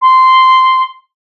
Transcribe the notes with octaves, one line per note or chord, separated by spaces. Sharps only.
C6